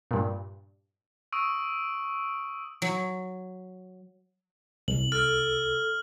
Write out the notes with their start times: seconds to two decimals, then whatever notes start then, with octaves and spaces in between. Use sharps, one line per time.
0.11 G2 A#2
1.32 C#6 D#6 E6 D7
2.82 F#3
4.88 C2 F#7
5.12 A4 E6 F6